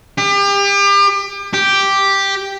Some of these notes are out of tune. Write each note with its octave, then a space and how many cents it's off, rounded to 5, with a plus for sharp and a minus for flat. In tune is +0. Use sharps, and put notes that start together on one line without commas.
G4 +35
G4 +0